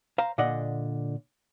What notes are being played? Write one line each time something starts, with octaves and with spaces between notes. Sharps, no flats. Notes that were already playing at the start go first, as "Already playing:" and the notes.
C5 F5 A#5
A#2 D3 D5 D#5 F#5